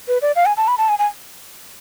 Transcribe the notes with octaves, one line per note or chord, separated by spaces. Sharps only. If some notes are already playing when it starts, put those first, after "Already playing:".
B4
D5
F5
G#5
A5
B5
A5
G#5
G#5